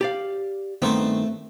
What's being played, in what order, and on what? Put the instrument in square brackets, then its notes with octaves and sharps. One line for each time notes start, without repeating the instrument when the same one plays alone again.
[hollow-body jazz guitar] G4 D5 F5
[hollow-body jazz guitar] G2 D#3 B3 [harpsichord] A3 C4